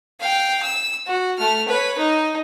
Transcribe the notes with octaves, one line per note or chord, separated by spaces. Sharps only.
F5 G5
E6
F#4
A3 F6
B4 C#5
D#4